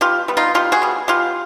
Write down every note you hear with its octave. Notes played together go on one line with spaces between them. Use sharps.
B2 F4 G4
G3 B3
D#4 F4
B2 F4 G4
F#4 G#4
G3 B3
B2 F4 G4